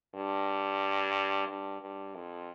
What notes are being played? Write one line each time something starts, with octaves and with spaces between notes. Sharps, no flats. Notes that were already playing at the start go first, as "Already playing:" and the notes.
G2
G2
G2
F2